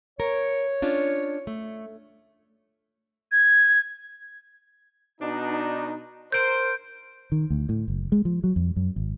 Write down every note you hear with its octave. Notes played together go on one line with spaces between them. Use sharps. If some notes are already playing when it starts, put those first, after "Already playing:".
A#4 C#5
C#4 D4 F4
A3
G#6
B2 D4 D#4
A#4 C5 G6 D7
D#3
D2
A2
F#1
G#3
F3
F#3
F2
F#2
G#1